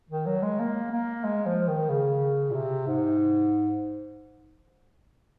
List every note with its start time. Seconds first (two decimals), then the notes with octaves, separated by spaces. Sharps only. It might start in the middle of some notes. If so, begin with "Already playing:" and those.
0.10 D#3
0.26 F#3
0.42 G#3
0.59 A#3
0.92 A#3
1.24 G#3
1.46 F3
1.68 D#3
1.90 C#3
2.50 A#2
2.54 C3
2.87 G#2